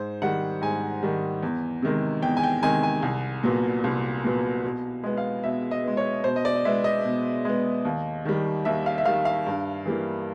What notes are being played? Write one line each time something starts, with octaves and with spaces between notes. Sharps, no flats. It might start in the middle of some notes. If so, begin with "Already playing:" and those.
Already playing: G#2 C5
D#3 G3 F#5
G#2 G#5
D#3 G3
E2
C3 D#3 G#3
E2 G5
G#5
G5
C3 D#3 G#3 G#5
G#5
C2
A#2 F#3 B3
C2
A#2 F#3 B3
B2
G#3 B3
F5
B2 E5
D#5
G#3 B3
C#5
B2 C5
D#5
D5
D#5
G#3 B3 E5
D#5
B2
G#3 B3
D#2
D#3 G3
D#2 E5
F5
E5
D#3 G3 F5
F5
G2
E3 G3 A#3